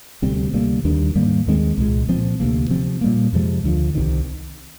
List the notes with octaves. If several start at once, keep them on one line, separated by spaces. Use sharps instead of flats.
D2 C3 G3 C4
D2 C3 G3 A#3
D#2 D#3 G3 D4
G#2 D#3 G3 A#3
D#2 D#3 G#3 C4
C2 A#2 G#3
A#2 F3 C4
D2 C3 F3 A#3
C3 F3 C4
A#2 G3 A#3
F2 C3 F3 G#3
D2 D3 F3
C2 C3 D#3